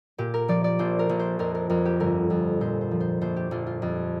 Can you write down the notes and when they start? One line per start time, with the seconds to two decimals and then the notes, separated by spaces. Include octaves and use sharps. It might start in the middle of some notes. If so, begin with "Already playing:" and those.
0.18 A#2 G4
0.34 A#4
0.48 F3 D5
0.64 D5
0.79 A#1 C5
0.99 A#4
1.09 A#1
1.19 C5
1.39 F2 A#4
1.55 A#4
1.70 F2 A#4
1.85 G4
2.00 G1 A#4
2.30 F2
2.61 A#2 C5
2.81 C5
2.91 F3
3.00 C5
3.21 A#1 C5
3.36 G4
3.51 A#1 F4
3.66 F4
3.82 F2